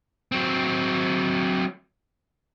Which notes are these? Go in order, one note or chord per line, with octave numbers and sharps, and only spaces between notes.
F#3 C4